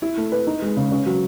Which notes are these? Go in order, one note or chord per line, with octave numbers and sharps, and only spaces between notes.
E4
A3
B4
D#4
G#3
C#3
C#4
F#3